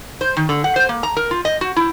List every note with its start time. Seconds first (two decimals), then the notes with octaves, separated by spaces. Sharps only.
0.21 C5
0.37 D#3
0.49 D3
0.64 F#5
0.76 C5
0.89 A#3
1.03 A#5
1.16 A#4
1.31 F4
1.45 D#5
1.61 F#4
1.76 E4